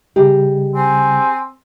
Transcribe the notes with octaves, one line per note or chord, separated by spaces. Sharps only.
C#3 G3 G4 G#4 D#5
C4 G#5